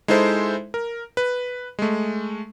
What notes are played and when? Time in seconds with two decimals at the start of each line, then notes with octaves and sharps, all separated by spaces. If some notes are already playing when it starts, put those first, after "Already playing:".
0.08 G#3 D#4 E4 A4 C5 E5
0.74 A#4
1.17 B4
1.79 G#3 A3